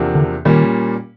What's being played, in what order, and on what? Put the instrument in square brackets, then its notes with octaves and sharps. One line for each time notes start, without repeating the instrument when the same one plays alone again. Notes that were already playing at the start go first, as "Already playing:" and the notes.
Already playing: [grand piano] E2 C3 F3 A#3 D4
[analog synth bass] D3
[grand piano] A#2 G3 A#3 C#4 [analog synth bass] D#3